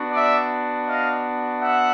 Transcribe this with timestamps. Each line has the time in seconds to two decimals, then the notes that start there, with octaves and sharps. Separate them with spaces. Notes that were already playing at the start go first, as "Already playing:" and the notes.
Already playing: B3 D4 F#4
0.12 D5 E5
0.86 D#5 F5
1.61 E5 F#5